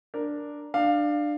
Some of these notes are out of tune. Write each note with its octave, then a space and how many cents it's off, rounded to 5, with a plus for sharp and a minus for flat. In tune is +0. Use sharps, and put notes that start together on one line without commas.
D4 +0 A#4 +0
D4 +20 F5 +0